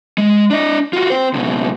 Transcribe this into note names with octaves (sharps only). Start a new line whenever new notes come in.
G#3
D4 D#5
F4 F#4
C4 C5
C#2 B2